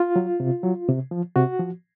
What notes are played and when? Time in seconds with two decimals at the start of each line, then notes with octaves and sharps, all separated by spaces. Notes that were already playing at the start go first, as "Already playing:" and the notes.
Already playing: F4
0.16 F#3
0.40 C3
0.63 F#3
0.88 C3
1.11 F3
1.36 C3 F#4
1.59 F3